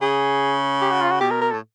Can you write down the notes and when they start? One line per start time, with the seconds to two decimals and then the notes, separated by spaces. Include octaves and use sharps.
0.02 C#3 G#4
0.81 G4
0.91 F#4
1.01 F4
1.11 F#4
1.21 B2 G4
1.31 A#4
1.41 A#4
1.51 A2 A4